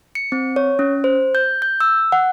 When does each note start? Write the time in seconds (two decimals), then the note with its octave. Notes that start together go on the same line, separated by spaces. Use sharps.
0.15 C#7
0.32 C4
0.56 C#5
0.79 C#4
1.04 C5
1.35 G6
1.62 G6
1.80 E6
2.12 F#5